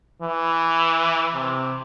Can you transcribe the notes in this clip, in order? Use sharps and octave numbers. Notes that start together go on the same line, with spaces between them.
E3
C3